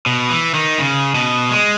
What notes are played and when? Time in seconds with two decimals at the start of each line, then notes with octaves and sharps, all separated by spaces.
0.06 B2
0.30 E3
0.54 D#3
0.79 C#3
1.15 B2
1.51 G#3